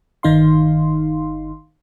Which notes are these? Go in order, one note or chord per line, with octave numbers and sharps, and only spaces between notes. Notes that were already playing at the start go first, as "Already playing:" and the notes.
G1 D#3 D#4 F5 C6